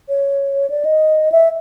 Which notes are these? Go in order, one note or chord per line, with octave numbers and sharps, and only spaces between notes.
C#5
D5
D#5
E5